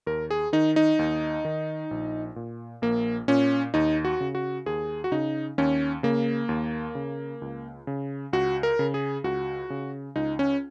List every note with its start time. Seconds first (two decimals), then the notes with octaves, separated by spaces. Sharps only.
0.07 D#2 A#4
0.31 G#4
0.53 D#3 D#4
0.76 D#4
0.99 D#2
1.45 D#3
1.91 A#1
2.36 A#2
2.82 A#1 A#3
3.28 A#2 C#4
3.74 D#2 D#4
4.05 F#4
4.20 C#3
4.35 F#4
4.66 D#2 G#4
5.04 F#4
5.12 C#3 D#4
5.58 D#2 C#4
6.03 C#3 A#3
6.49 D#2
6.95 C#3
7.42 C#2
7.87 C#3
8.33 C#2 F#4
8.63 A#4
8.79 C#3
8.94 G#4
9.24 C#2 F#4
9.70 C#3
10.16 C#2 D#4
10.39 C#4